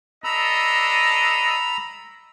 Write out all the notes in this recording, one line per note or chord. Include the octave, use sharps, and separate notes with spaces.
D4 A4 D#5 A#5 B5 E6